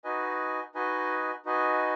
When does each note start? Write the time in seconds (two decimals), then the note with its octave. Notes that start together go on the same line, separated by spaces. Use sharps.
0.04 D#4 F#4 B4 D#5 G#5
0.75 D#4 F#4 B4 D#5 G#5
1.45 D#4 F#4 B4 D#5 G#5